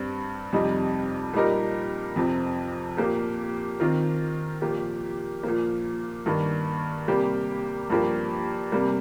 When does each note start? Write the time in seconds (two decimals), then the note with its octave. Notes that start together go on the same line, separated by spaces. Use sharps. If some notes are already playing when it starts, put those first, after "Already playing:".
Already playing: G2 G3 C4
0.52 F2 C3 G3 D#4
1.34 A#2 G3 D#4 G4 A#4
2.16 F2 C3 F3 C4
2.97 A#2 A#3 G4
3.80 D#3 C4 F4 A#4
4.62 A#2 F3 A#3 G4
5.43 A#2 F3 A#3
6.26 G2 D#3 A#3
7.08 C3 G3 A#3 G4
7.90 G2 F3 A#3 G4
8.72 C3 G3 A#3